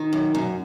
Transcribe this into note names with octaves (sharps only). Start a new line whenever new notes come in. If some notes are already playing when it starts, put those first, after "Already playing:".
Already playing: D#3
F#2
F#2